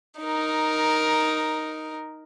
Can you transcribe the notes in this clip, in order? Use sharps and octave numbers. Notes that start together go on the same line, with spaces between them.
D#4 A#4